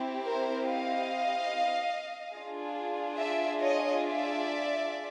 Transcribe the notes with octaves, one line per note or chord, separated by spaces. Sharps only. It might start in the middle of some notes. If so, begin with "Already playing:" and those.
Already playing: C4 E4 G4
A#4 C5
D#5 F5
D4 F4 G#4
D5 E5
C#5 D#5
D5 E5